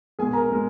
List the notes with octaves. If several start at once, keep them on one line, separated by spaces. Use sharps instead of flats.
B2 G#3 G#4 G#5
A#4 A#5
B2 G#3